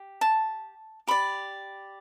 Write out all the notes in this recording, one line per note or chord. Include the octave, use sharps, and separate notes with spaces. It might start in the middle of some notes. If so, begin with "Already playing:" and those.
Already playing: G4
A5
G4 D5 B5